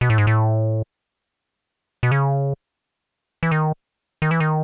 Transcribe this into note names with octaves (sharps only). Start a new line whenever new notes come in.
B2
A2
G#2
A2
B2
C#3
E3
D#3
D#3
E3
D#3